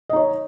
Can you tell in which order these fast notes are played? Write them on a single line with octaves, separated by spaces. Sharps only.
D#5 D#4 C#5